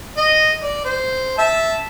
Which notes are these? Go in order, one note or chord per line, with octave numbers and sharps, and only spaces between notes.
D#5
D5
C5
E5 A5